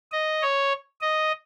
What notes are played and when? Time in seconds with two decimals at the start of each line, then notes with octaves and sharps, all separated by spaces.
0.12 D#5
0.42 C#5
1.01 D#5